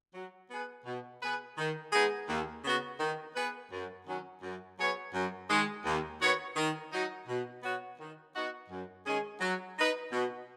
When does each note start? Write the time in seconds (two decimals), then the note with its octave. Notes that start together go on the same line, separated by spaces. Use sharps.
0.14 F#3
0.51 B3 G#4 B4
0.86 B2
1.22 B3 G#4 B4
1.58 D#3
1.93 G#3 B3 D#4 G#4
2.29 D#2
2.65 C#3 B3 F#4
3.00 D#3
3.36 B3 G#4 B4
3.72 F#2
4.07 D#3 F#3 C#4
4.43 F#2
4.78 F#3 B3 G#4 C#5
5.14 F#2
5.49 D#3 G#3
5.85 D#2
6.22 D#3 B3 F#4 C#5
6.56 D#3
6.93 F#3 D#4
7.28 B2
7.63 B3 F#4 C#5
8.00 D#3
8.35 B3 D#4 F#4
8.70 F#2
9.06 D#3 G#3 C#4 G#4
9.41 F#3
9.78 D#4 B4
10.13 B2